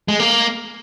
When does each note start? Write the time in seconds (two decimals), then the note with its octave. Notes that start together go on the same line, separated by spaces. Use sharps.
0.08 G#3
0.20 A#3